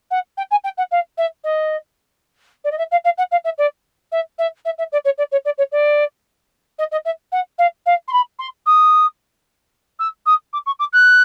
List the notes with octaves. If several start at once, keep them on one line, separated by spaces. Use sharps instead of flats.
F#5
G5
G#5
G5
F#5
F5
E5
D#5
D5
D#5
E5
F5
F5
F#5
F5
E5
D5
E5
E5
E5
E5
D5
C#5
D5
C#5
D5
C#5
D5
D#5
D#5
E5
F#5
F5
F5
C6
B5
C6
D#6
E6
D#6
D6
C#6
D6
F#6